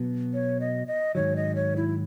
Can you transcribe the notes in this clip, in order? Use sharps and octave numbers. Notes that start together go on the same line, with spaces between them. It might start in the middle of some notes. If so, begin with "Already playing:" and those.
Already playing: B2 F#3 B3
C#5
D#5
D#5
G#2 D#3 F#3 C#5
D#5
C#5
E4